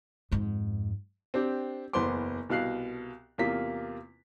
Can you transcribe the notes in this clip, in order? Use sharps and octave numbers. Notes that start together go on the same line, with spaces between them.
F2 G#2
C4 D4 G4
F#1 E2 B3 C5 C6 D6
C2 B2 F5 F#6 C7
E2 C3 A#3 F4 B6